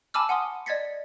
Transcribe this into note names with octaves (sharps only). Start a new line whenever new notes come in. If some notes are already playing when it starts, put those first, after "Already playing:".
G#5 A5 B5 D6 E6 F6
F#5 G#5 C6 D#6
D5 D#5 G#6 A6 B6 C#7